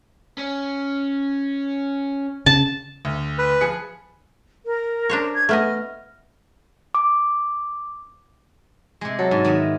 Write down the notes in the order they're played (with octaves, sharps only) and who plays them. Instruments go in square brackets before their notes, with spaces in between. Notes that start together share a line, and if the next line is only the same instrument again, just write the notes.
[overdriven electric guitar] C#4
[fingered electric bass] C#3 [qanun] A5
[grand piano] D2
[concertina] B4
[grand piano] F3 G#4 C#7
[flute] A#4
[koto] D4 C5 C#5
[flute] G#6
[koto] A3 B3 D#5 [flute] F6
[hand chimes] D6
[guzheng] C3 G#3
[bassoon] F#3 [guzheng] A4
[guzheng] G#2
D#3 B3 E5